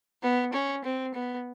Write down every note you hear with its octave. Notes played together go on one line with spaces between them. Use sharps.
B3
C#4
C4
B3